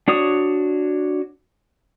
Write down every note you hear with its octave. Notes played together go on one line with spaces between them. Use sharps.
D4 F#4 C#5 D#6